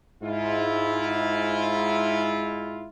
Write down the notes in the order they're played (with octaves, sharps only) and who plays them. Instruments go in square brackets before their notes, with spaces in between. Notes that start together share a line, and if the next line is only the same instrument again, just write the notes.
[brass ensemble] G#2 E4 F4